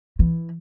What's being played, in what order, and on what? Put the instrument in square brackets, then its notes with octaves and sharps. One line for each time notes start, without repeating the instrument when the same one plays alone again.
[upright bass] E3